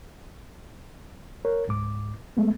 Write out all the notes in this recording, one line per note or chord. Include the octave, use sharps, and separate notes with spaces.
A#4 C#5
C#2 G#2 D6
G#3 A3 B3